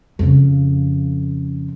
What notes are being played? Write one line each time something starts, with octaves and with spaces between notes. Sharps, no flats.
F2 C#3